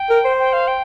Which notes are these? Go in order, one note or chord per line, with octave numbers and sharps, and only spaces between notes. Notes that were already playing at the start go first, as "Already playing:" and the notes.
Already playing: G5
A#4
C5
G5
F5
G5